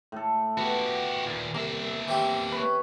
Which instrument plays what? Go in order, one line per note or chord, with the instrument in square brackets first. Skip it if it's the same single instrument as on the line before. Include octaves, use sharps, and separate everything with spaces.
[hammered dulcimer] A2 A4
[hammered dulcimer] B3 [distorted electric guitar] F#4 G4
[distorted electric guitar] A#2 D#3
[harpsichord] C2 [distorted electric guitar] A#3 E5
[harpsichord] E3 C4 G4
[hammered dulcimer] B4 C#5